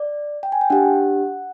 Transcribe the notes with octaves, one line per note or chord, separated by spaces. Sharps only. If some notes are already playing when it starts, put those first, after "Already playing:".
Already playing: D5
G5
G#5
G5
D4 G4 F#5